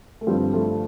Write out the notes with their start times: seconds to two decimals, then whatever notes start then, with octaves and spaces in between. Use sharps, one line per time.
0.21 A3
0.27 G2 D3 F3 G3 C4
0.54 F3 A3